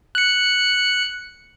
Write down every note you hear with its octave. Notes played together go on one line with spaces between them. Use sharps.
F#6 C#7